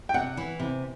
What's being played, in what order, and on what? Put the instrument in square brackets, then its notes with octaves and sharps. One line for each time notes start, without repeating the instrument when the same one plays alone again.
[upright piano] G5
[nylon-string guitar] C3 [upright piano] F#5
[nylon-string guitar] E3
C3